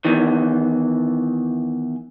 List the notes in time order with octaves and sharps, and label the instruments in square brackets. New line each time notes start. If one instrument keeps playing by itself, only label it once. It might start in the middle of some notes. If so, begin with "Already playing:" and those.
[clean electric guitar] E2 D#3 E3